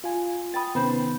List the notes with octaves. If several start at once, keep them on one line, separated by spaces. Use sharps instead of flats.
F4 G#5
G5 B5 D#6 A6
C3 D#3 B3 C#4 C5 B5